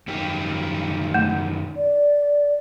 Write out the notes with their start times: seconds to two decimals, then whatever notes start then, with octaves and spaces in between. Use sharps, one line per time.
0.08 F#2 D#3 G4
1.14 A3
1.77 D5